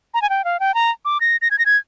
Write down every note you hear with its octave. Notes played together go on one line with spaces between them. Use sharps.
A#5
G#5
G5
F5
G5
A#5
D6
A#6
A#6
G#6
A#6
G#6